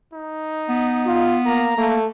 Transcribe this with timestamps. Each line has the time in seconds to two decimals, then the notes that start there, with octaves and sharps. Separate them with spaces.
0.13 D#4
0.69 B3
1.06 F4
1.46 A#3 A#5
1.77 A3 A#3